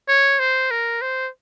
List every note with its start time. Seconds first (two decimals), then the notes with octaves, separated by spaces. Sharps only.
0.08 C#5
0.39 C5
0.71 A#4
1.02 C5